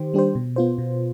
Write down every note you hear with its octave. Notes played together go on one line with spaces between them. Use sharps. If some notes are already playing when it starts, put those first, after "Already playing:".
Already playing: D#3 G4 C5
G3 D4 G4 C5
B2
B3 F4 C5
B2